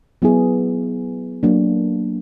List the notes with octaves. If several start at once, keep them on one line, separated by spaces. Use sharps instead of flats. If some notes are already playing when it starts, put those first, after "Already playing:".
F#3 B3 E4 G#4
F#3 A#3 D4